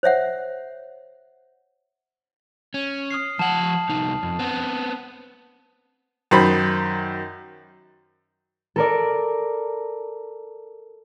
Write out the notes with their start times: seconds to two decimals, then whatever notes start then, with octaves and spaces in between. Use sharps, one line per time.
0.03 C5 C#5 E5 F#5
2.74 C#4
3.11 D#6 F6 C7
3.39 F3 F#5 A5 E7 F#7
3.89 C2 D#4
4.23 F2
4.39 B3 C4
6.31 F#2 D#3 C5 B5
8.76 A4 A#4 D5